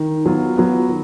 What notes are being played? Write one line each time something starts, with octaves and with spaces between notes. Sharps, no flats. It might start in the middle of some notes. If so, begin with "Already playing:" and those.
Already playing: D#3
F#3 B3 F4
F#3 B3 F4
D#3